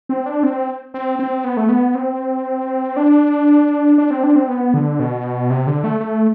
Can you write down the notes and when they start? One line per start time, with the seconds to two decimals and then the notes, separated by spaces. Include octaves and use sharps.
0.09 C4
0.26 D4
0.43 C4
0.94 C4
1.19 C4
1.44 B3
1.57 A3
1.69 B3
1.95 C4
2.97 D4
3.98 D4
4.11 C4
4.23 D4
4.36 C4
4.48 B3
4.74 D3
5.00 B2
5.50 C3
5.67 D3
5.84 A3
6.01 A3